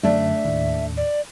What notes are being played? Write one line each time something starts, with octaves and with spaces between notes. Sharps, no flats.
F#2 D3 A3 D4 E5
D#2 A2
D5